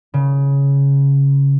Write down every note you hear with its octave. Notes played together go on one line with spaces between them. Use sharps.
C#3